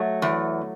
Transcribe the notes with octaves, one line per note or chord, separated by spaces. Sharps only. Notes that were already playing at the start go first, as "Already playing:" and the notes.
Already playing: F#3 A3
E2